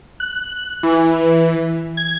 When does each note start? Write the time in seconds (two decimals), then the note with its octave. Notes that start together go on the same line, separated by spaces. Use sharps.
0.20 F#6
0.83 E3
1.97 G#6